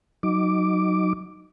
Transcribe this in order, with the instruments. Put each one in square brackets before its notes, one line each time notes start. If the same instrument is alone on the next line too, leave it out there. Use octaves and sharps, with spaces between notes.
[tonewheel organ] F#3 D#4 D6